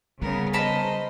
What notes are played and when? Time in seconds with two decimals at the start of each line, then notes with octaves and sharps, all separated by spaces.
0.22 C#3 G3 B3 A#4
0.53 A#4 C5 D#5 A5 B5